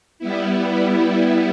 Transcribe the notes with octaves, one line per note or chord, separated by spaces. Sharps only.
G3 B3 E4